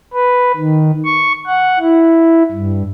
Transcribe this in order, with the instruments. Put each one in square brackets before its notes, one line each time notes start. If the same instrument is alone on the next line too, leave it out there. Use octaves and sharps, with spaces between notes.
[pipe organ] B4
D#3
C#6
F#5
E4
G2